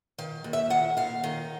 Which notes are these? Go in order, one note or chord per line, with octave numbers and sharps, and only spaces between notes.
D#3 F5
D#2
E5
D#3 F#5
D#2 F5
D#3